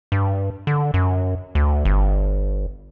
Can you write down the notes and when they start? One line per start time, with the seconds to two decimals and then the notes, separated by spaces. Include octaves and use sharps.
0.12 G2
0.67 D3
0.94 F#2
1.55 D2
1.85 G1